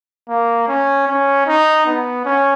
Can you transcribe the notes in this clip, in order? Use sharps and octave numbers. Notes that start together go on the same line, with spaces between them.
A#3
C#4
C#4
D#4
B3
C#4